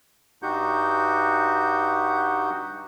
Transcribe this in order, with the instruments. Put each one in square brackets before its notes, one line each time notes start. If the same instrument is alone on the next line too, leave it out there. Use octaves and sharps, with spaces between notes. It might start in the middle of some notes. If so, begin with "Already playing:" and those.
[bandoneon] G2 D#4 F#4 G4 F#5 G6